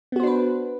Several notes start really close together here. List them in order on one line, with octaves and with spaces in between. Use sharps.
B3 F#4 C5 D4 B4